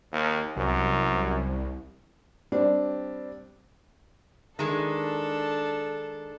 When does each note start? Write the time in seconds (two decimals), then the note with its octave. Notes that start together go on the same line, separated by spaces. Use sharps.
0.12 D#2
0.56 C2 F#2
2.52 G3 C4 D4
4.59 D#3 G#3 D4 A4